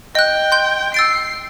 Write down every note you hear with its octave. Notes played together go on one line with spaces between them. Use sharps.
D#5 G5 F#6
C6 G6
E6 A6 C7 D7